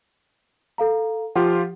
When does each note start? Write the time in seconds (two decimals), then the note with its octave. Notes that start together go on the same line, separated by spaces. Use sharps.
0.78 A4 F5 A#5
1.35 F3 F4 G4 F#5